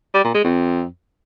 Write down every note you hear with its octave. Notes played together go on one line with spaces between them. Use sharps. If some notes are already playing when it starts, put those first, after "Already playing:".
G3
A#2
G#3
F2